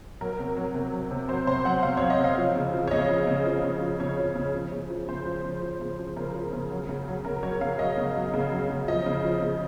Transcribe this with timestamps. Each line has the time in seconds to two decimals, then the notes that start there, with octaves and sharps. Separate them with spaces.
0.21 F#3 A#4
0.39 C3
0.56 F#3
0.74 C3
0.92 F#3
1.11 C3
1.29 F#3 C5
1.47 C3 C5
1.65 F#3 F#5
1.83 C3 F5
1.97 C#5
2.01 F#3
2.10 D#5
2.19 C3 F5
2.38 F3
2.56 C#3
2.74 F3
2.88 C#5
2.91 C#3 D#5
3.10 F3
3.27 C#3
3.46 F3
3.63 C#3
3.81 F3
4.00 C#3 C#5
4.19 F3
4.36 C#3
4.55 F3
4.72 C#3
4.90 F3
5.08 C#3 C5
5.26 F3
5.45 C#3
5.62 F3
5.81 C#3
5.99 F3
6.16 C#3 A#4
6.35 F3
6.53 C#3
6.71 F#3
6.89 C#3
7.08 F#3
7.25 C#3 A#4
7.43 F#3 C#5
7.61 C#3 F5
7.79 F#3 D#5
7.98 C#3
8.16 F#3
8.34 C#3
8.51 F#3
8.69 C#3
8.88 F3 D#5
9.06 C#3
9.24 F3
9.42 C#3